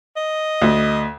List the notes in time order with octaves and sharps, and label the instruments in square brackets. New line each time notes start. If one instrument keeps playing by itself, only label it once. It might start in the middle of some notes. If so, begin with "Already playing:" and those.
[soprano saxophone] D#5
[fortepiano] D2